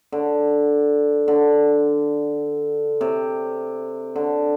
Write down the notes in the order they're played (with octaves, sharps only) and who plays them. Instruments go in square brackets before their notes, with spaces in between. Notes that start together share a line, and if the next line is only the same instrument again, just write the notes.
[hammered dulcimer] D3
D3
C3
D3